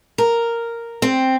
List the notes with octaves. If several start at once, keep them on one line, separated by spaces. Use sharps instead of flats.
A#4
C4